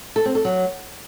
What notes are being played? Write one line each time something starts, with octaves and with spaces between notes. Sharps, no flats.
A4
C4
A4
F#3